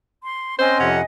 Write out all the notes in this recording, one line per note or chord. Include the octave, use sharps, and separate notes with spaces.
C6
C4 C#4 C5 D#5 G#5
F2 C3 C#4 F#5